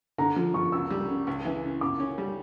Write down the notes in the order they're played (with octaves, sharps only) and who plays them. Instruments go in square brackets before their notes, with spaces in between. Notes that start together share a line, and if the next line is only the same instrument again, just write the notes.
[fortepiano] D3 [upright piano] A#5
[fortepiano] F3
[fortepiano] F3 [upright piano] C#6
[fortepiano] C#2 [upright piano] E6
[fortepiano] G3
C#3
C#2
E3
C#3
[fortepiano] C#3 [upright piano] D6
[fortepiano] C#4
G3